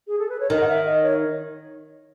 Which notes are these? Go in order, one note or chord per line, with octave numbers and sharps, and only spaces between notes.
G#4
A4
B4
C#5
D#3 D#5
F#5
E5
D#5
C#5